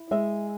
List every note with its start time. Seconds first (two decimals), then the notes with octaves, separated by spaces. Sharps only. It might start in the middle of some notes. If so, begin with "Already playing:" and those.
Already playing: E4
0.11 G#3 E5